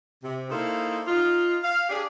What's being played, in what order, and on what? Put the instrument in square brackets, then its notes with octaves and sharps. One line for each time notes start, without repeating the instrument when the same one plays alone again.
[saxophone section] C3
A#3 D#4 E4 A4 C5
D#4 F4
F5
D4 G4 G#4